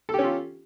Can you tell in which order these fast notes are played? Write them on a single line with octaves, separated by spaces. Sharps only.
A4 G4 C#4 F4